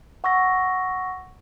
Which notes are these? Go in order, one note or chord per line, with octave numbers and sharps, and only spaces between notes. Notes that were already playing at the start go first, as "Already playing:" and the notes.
F#5 C#6 E6 A#6